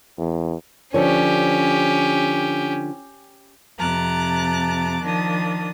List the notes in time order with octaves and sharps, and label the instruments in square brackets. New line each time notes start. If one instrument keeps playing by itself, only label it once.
[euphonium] E2
[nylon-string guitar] D3 F3 C#5 [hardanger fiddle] C#4 G4
[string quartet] F2 C3 A5 A#5 D6 F#6
D#3 F3 D4 A5 D#6